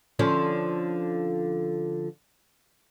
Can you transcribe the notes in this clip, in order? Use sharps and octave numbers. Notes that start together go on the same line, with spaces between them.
D3 F3 C#4